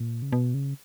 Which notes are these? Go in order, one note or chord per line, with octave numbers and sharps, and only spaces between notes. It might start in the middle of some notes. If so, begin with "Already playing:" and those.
Already playing: A#2
C#3
B2
C#3